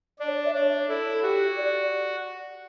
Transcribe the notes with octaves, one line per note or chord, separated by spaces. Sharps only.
D4 D5
C#5
D5
E5
D4 C#5
E4 A4
F#4 G4
D5